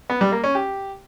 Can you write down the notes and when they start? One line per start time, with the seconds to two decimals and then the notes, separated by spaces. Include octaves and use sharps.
0.10 B3
0.21 G3
0.32 A#3
0.44 C#4
0.55 G4